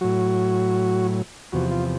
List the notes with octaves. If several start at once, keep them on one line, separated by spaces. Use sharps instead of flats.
A2 F#3 F#4
E2 C3 F3 F#4
F4